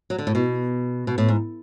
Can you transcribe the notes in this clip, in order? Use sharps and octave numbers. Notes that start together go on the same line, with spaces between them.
F#3
D3
A2
B2
B2
A2
G#2